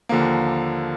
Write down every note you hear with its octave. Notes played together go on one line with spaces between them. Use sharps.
D#2 D3 F3 A#3